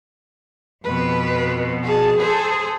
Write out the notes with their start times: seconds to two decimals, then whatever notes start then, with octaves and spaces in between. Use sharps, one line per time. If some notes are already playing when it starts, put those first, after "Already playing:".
0.84 F2 B2 B4
1.83 G#4 A5
2.19 G#4 A4 C5